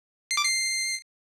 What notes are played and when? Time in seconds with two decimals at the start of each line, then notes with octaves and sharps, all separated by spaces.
0.31 C7
0.37 D6
0.44 C7